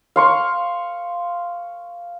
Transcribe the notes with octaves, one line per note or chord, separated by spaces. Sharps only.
F5 C6 C#6